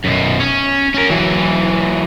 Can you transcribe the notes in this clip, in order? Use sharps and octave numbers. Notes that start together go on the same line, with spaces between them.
F#2 B2
C#4
C#4 A#4
E3 F#3